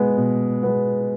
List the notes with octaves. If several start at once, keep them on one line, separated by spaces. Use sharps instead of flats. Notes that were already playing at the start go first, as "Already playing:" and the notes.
Already playing: B2 G#3 B3
B2
G#3 B3